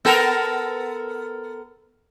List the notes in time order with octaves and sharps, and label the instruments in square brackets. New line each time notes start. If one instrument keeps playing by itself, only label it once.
[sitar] B3 A4 A#4